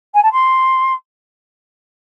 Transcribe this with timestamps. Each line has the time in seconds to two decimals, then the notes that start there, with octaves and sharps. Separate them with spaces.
0.14 G#5
0.23 A5
0.32 C6